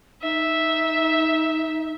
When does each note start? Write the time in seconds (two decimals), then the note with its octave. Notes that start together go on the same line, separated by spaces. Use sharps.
0.23 D#4 E5